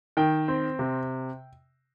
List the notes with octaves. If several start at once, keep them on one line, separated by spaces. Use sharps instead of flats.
D#3 G5
C4
C3